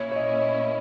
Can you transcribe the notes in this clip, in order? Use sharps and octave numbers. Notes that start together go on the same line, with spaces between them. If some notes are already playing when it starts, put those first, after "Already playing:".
Already playing: A#2 A#3 C#4 E4 C#5
C#5
D#5